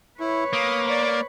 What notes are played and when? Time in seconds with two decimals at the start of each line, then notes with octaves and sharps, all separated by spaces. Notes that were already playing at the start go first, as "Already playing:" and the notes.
0.20 E4 B4 C#5
0.53 A#3 D#6
0.90 D5